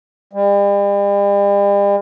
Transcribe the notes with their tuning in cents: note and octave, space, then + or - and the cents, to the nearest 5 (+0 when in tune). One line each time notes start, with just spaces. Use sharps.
G3 +40